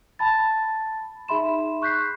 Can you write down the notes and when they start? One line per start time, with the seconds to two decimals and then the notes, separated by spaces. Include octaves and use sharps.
0.19 A5 B5 A6
1.28 D#4 G#4 E5 B5 C6 E7
1.82 C#6 F#6 G6 B6 C7